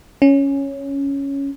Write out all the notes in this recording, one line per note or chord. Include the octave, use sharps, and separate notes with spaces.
C#4